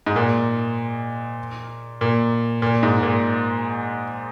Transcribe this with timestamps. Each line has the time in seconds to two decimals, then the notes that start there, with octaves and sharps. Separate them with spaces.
0.06 G#2
0.16 A#2
2.01 A#2
2.62 A#2
2.83 G#2
3.03 A#2